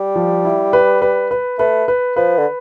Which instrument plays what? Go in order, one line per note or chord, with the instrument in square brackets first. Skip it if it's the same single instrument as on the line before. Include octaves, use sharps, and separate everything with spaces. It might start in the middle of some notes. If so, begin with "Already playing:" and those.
Already playing: [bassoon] G3
[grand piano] F3
E4
B4
B4
B4
[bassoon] A3 [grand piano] B4
[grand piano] B4
[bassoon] F3 [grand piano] B4
[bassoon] D3